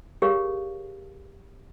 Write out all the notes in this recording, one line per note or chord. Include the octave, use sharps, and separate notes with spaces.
G4 G#4 A#4 C#5 F5